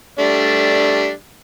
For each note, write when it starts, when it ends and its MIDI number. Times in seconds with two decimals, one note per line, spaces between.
0.19 1.10 55
0.19 1.10 57
0.19 1.10 62